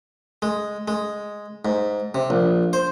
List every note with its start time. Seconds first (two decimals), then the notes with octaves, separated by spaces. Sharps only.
0.42 G#3
0.88 G#3
1.65 G#2
2.15 C3
2.30 A#1
2.73 C5